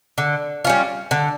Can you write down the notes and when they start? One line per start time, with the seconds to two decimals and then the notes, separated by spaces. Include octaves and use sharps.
0.18 D3
0.65 G3 C#4 F4
1.11 D3